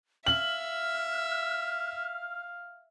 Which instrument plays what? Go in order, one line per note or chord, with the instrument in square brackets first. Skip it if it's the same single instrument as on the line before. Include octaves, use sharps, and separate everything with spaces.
[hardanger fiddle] E5 [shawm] F5 [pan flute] F6 [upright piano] F#7